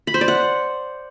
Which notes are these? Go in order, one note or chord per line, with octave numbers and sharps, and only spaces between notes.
B5
C5
D5
F#5